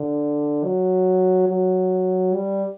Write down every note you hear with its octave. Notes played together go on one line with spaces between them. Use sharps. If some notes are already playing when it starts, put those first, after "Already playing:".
Already playing: D3
F#3
F#3
G3